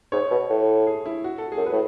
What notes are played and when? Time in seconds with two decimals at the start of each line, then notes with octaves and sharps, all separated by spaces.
0.12 G#2 C#5
0.31 B2
0.50 A2
0.87 G#4
1.06 E4
1.24 F#4
1.38 A4
1.52 G#4
1.57 F#2
1.66 B4
1.72 A2